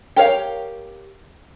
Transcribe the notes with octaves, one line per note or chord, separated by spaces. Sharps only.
G4 A#4 C#5 F5 G5